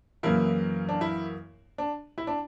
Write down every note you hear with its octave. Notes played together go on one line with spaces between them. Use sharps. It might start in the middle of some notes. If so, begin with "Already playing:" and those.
F#2 C#3 E3 A#3 E4
D4
E4
D4
E4
D4